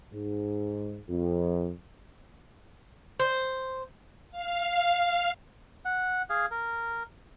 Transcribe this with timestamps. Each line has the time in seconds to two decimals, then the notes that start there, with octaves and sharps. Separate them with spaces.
0.13 G#2
1.09 F2
3.20 C5
4.31 F5
5.85 F#5
6.30 G#4 F5
6.51 A#4